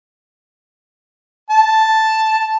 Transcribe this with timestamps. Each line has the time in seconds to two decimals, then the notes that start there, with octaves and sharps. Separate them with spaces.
1.50 A5